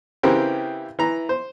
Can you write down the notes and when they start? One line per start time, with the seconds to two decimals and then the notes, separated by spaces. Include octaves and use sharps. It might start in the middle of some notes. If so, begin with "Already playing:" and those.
0.23 C#3 E3 C4 G4 A#4
0.99 E3 A#5
1.29 C5